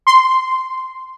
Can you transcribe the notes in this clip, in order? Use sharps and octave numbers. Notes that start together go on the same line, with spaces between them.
C6